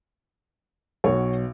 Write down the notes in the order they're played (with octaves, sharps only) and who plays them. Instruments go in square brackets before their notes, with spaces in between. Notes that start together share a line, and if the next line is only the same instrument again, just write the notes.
[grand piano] B1 B2 [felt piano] C#5